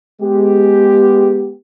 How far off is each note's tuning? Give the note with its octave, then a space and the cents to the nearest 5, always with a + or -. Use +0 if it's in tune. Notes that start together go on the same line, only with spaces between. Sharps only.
G#3 +0 B3 +0 G4 +0